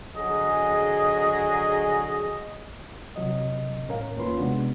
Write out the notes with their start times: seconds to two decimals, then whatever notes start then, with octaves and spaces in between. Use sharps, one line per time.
0.16 D3 F#3 G#4 D#5
3.16 C3 F#3 D#5
3.88 A2 C#4 A#4 F5
4.16 D#2 A#3 C#4 F4 B4 C6
4.37 C3 G#3 B3 D4 F#4